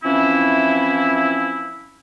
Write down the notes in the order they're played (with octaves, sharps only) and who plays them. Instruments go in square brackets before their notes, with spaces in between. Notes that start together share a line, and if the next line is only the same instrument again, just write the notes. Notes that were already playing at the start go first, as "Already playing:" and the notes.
[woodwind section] E3 F3 C4 C#4 E4